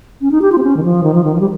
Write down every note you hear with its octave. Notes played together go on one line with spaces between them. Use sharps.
C#4
D#4
G4
F4
C4
C#4
D#3
F3
D#3
F3
D#3
F3
G3